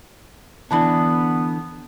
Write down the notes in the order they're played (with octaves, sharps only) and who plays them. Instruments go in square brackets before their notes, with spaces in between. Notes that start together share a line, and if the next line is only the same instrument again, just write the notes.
[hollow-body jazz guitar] D3 E3 D4 [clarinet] B3 [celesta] A5 B5